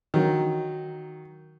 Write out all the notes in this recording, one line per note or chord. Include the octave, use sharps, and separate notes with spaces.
D#3 F#3